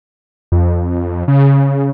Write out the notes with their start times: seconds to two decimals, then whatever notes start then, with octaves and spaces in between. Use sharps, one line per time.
0.52 F2
1.28 C#3